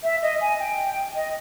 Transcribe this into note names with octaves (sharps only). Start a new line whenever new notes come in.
E5
D#5
G#5
G5
D#5